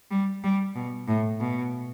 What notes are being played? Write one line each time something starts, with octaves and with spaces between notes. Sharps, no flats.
G3
G3
B2
A2
B2